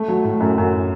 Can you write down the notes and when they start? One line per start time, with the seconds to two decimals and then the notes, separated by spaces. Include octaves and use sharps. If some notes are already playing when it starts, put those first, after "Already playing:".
Already playing: A3
0.08 F#3
0.24 A2
0.40 F#2
0.58 F#2